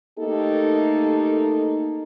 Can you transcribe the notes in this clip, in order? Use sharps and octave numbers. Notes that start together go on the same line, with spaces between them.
A3 A#3 D#4 G4 A4